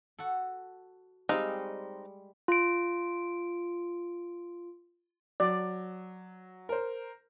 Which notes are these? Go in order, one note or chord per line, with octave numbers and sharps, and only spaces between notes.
F#4 A4
G3 G#3 C4 D#4 G4 F5
F4 D7
F#3 D5
A#4 C5